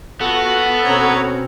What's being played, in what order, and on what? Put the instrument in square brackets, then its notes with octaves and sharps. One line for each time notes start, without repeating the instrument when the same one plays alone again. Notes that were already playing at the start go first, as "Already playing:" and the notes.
[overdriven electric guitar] B3 [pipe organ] F4 [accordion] F#4 [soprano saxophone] A4
[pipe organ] B2 C4 C#4 [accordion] C#5 F#5 A#5